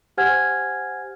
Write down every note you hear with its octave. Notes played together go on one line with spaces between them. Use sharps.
G4 C5 F#5 G#5 F6 G#6